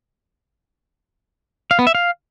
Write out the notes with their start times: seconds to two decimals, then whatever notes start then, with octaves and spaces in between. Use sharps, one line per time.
1.71 F5
1.79 B3
1.87 E5
1.95 F5